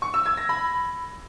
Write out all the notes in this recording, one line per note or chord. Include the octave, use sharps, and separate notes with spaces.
C#6
E6
G#6
A#6
B5